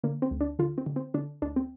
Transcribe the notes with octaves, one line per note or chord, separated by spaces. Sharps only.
D3 A#3
C4
D2
D4
D3 F4
C4
D3
C4
D3 D4
D2 D4
C4